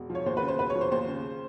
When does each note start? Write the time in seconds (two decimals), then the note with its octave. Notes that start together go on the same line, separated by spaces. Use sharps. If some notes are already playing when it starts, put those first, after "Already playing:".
Already playing: E1
0.10 F3
0.15 C#5
0.26 D#2 C5
0.37 B4
0.42 C#3
0.48 C5
0.59 E1 B4
0.70 C#5
0.75 F3
0.81 C5
0.92 D#2 C5
1.08 C#3